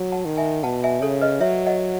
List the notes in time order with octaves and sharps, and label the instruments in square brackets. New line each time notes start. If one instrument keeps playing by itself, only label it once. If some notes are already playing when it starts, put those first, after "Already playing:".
Already playing: [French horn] F#3
[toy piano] F#5 A5
[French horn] D#3
[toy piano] E5 G#5
[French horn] B2 [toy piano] F#5 A5
[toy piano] E5 G#5
[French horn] C#3 [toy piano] A4 C#5
[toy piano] B4 D#5
[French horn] F#3 [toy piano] C#5 E5
[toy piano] D#5 F#5